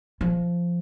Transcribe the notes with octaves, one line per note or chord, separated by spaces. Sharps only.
F3